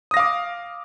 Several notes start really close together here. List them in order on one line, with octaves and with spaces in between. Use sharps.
D#6 A#6 F5 D6